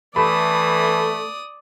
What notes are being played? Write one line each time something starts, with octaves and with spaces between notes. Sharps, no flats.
E3 A3 D5 B5 D#6